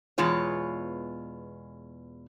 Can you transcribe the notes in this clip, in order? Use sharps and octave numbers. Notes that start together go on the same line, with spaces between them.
E2 B2 G#3 F4 C#5